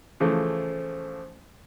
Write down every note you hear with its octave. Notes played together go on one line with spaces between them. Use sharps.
C#3 E3 F3 A3